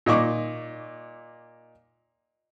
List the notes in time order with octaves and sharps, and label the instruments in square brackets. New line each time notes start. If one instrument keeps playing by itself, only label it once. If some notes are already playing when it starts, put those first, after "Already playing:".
[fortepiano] A#2 D#4 C#6 D6